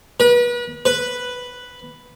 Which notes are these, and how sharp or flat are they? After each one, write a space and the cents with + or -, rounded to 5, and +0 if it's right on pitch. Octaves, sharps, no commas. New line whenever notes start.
B4 -35
B4 +0